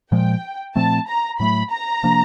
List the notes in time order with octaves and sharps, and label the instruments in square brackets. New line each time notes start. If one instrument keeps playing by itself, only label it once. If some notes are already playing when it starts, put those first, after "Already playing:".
[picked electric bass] A#2 F3 G#3 [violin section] G5
[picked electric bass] A#2 F3 A3 C4 [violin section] A5
[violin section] A#5
[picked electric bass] A2 F#3 A3 [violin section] B5
[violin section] A#5
[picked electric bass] C3 F3 A#3 D4